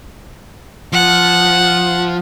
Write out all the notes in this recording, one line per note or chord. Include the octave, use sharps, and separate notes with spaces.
F3 F#5